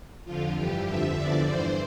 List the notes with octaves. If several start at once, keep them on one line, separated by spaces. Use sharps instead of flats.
F2 D3 F3 F4
G2 E3 G4
F2 D3 F3 E5
E2 D3 F3 D5
G2 E3 C5